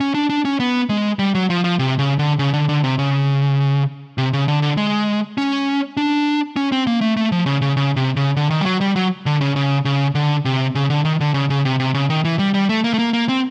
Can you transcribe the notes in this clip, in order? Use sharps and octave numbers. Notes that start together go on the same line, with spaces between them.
C#4
D4
D4
C#4
B3
G#3
G3
F#3
F3
F3
C3
C#3
D3
C#3
D3
D3
C3
C#3
C3
C#3
D3
D3
G#3
C#4
D4
C#4
C4
A#3
A3
A3
F3
C#3
C#3
C#3
C3
C#3
D3
D#3
G3
F#3
G3
F#3
D3
C#3
C#3
C#3
D3
C3
C#3
D3
D#3
D3
C#3
C#3
C3
C3
C#3
D#3
E3
G3
G3
A3
A#3
A3
A#3
A#3
C4